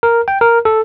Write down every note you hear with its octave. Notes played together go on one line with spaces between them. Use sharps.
A#4
G5
A#4
A4